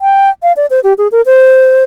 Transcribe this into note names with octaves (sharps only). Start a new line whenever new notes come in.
G5
F5
D5
C5
G4
G#4
A#4
C5